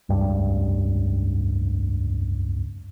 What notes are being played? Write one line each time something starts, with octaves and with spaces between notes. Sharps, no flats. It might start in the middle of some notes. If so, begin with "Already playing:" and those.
F1 C#2 G2 G3